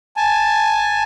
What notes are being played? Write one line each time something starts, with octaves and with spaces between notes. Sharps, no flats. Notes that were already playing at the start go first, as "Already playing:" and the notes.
G#5 A5